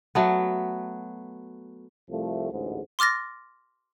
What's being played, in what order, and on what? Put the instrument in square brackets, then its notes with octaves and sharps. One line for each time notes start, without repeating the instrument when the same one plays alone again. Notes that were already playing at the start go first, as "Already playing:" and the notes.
[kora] F#3 A3 B3
[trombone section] C2 F3 A3
A1 D2 G#2
[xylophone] C6 D6 F6 A6 A#6